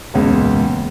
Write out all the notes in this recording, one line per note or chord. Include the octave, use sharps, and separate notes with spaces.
E1 C#2 A#2